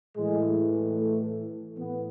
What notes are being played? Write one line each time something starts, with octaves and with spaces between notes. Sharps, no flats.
A2 E3 G#3
A3
A2 E3 B3